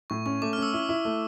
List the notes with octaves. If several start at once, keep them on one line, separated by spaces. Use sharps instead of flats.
A2 C#6
C#4 C#6
A3 D6
F6
C#4 E6
E4
E4
A3